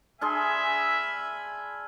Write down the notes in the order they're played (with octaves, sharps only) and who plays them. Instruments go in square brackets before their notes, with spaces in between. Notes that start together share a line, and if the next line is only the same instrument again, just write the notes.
[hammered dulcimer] D4 G#4 C6 [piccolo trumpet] E5 [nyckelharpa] G#5 B5 [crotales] E6 F6